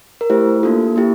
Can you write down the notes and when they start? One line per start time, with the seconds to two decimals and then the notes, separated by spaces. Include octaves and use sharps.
0.21 A#4
0.30 A3 E4 G4 C5
0.63 A#3 D4 F4 A4
0.96 A#3 E4 G4